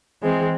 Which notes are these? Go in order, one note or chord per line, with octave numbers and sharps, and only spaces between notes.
E3 G#3 C4